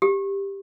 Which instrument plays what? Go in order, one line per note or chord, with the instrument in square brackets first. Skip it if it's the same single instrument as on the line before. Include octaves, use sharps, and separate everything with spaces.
[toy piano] G4